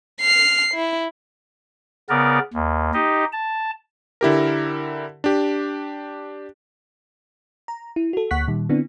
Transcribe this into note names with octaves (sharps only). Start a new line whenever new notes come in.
F6 C7
E4
C#3 B3 A#4 D5
D#2
D#4 G4 D#5
A5
D3 E4 G4 A#4
D4 G4
A#5
E4
F#4 A4
D2 A#3 F#5 C#6 F#6 B6
A#2 D#3 G3
D3 B3 C4 D4 E4